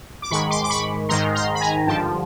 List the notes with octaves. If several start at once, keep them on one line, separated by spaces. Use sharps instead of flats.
D6
G#2 D#3 G#3 B5 C#6
C6 D6
D6
B5 C#6
G#2 D#3 G#3 A#5 C6
A#5 C6
B5
G#5 A#5
G2 D3 F3 G5 A5